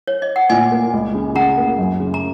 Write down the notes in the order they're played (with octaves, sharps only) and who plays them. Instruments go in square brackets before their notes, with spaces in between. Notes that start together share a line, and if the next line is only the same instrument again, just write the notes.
[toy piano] C#5
D#5
F#5
[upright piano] A#2 [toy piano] D#5 G#5
[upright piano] A#3
C#2
C#3
[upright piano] C#3 [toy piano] F#5 A#5
[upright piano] A#3
F#2
C#3
[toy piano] A#5